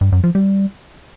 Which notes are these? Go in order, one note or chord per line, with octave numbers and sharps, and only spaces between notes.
G2
F#2
F3
G3